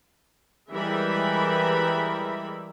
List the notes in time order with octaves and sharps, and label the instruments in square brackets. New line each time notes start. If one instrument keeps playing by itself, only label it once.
[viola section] E3 G3 G#3 A#4 E5 B5